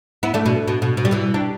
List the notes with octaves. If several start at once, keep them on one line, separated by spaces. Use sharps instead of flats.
B3 E4
A3 D4
B2
B2
B2
B2
G3
B2 E3
D4 G4